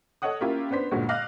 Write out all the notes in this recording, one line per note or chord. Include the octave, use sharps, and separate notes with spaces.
A4 C#5 D#5 F#5 D#6
A#3 C#4 E4 F4 G4 A#4
B3 D4 C5 B6
G1 D2 A#2 D3 G#3 F#4
D#5 F5 D6 F6 F#6 A#6